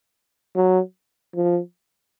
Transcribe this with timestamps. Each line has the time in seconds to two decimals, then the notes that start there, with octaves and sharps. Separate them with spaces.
0.56 F#3
1.35 F3